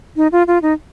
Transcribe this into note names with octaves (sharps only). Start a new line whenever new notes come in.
D#4
F4
F4
D#4